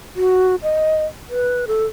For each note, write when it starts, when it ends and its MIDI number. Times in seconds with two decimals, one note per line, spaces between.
0.16 0.56 66
0.63 1.05 75
1.29 1.65 71
1.67 1.85 69